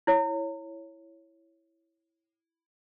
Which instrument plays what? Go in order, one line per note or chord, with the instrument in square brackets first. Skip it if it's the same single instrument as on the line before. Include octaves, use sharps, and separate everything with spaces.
[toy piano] E4 C#5